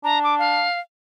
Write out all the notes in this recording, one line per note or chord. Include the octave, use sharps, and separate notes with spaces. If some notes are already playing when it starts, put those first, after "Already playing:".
D4 A#5
D6
F5